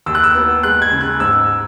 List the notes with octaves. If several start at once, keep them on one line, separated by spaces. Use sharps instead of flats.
D#2 E6
F#6
E6
B3
G#3 F#6
G#6
C#3
F#6
G#2 E6